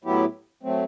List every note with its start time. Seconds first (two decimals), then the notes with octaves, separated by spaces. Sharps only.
0.04 A2 F#3 B3 E4 G4
0.63 F#3 A3 C4